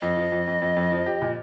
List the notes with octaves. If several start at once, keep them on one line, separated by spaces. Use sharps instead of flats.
F2 D#5
F3
F2
F2
F2
F2
F3
G4
A#2